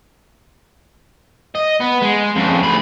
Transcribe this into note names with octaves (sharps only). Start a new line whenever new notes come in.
D#5
B3
G#3
F2 C#3
D2 B5